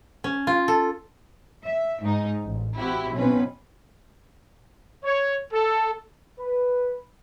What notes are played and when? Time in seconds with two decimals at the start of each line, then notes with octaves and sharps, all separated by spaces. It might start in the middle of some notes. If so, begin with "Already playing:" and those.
0.24 C#4
0.47 F4
0.68 A4
1.63 E5
2.00 G#2 D#4
2.42 A1
2.77 C4 E4 F#4 G4
3.13 B1 B2 C4 C#4 B4
5.04 C#5
5.52 A4
6.40 B4